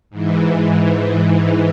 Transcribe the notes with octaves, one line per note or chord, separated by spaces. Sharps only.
G#2 E3